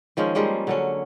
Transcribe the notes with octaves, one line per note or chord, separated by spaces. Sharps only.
D#3 F3 G#3 C#4
F3 G3 G#3 A#3
D3 F#3 C#4